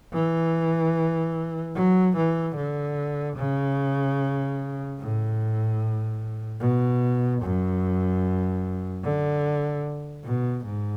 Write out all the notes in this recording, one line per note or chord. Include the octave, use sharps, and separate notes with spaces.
E3
F#3
E3
D3
C#3
A2
B2
F#2
D3
B2
G#2